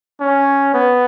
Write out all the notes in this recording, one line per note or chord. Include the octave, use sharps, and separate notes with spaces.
C#4
B3